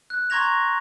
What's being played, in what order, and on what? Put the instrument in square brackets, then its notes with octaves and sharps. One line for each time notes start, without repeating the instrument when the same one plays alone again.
[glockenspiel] F#6
A#5 C6 C#6 G#6 A#6 F7